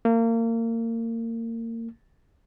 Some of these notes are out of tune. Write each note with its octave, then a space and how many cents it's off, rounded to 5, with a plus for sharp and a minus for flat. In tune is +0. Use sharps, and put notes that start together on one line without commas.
A#3 -30